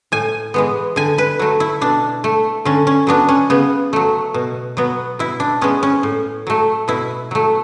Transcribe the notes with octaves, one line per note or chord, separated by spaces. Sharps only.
A2 G#5
E3 G#3 B3
D3 G#5
B4
F#3 A3
E4
B2 D4
A3
D3 C#4
C#4
F#3 B3 D4
C#4
C#3 B3
F#3 A3
B2
F#3 B3
B2 E4
D4
G#3 B3 C#4
C#4
A2
F#3 A3
B2 E4
F#3 A3